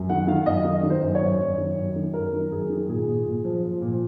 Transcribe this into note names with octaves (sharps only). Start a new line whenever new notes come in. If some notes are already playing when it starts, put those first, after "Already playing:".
Already playing: F#2
D#3 F#5
D#3 F5
F#2 D#5
D#3
D#3
C5
F#2
C#5
F#2
F#2
D#3
F#2
D#3
F#2 A#4
D#3
F#2 G#4
D#3
A#2 G#4
A#2
A#2
F3
F3
A#2